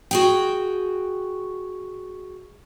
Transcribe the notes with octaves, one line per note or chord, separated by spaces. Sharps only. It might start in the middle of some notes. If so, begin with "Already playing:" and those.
F#4 G#4 G5